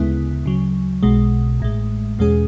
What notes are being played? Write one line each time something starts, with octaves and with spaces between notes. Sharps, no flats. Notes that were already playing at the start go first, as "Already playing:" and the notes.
Already playing: D2 C#3 G#3 B3 E4
D2 C#3 F#3
B1 B2 G#3
A1 A2 G#3
E2 B2 G#3 C#4 G#4